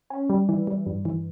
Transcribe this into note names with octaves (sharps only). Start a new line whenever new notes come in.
C#4
G3
E3
G3
G2
E3